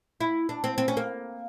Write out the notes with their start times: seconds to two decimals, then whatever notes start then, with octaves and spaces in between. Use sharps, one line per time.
0.21 E4
0.49 D4
0.64 C4
0.78 C4
0.88 C#4
0.97 A#3